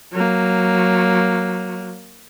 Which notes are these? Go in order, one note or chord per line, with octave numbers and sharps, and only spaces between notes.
F#3 A#3